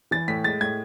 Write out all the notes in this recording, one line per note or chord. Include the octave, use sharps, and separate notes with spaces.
E3 A6
A2 B6
G#3 A6
A2 G#6